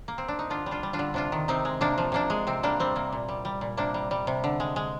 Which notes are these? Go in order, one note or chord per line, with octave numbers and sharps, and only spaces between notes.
A#3
C4
D4
D#4
D3 D4 F4
G3
D4 F4
G3
D4 F4
D3
C3 D4 F4
D#3
C3 C4 D#4
G#3
C3 A#3 D4
F3
C3 A#3 D4
G#3
C3 C4
G3 A#3 D4
G3 C4
C3 A#3
A#2
G3
G3
A#2
C3 A#3 D4
G3
G3
C3
D3
G#3
G#3